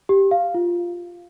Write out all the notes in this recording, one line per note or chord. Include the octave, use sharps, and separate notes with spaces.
G4
F5
F4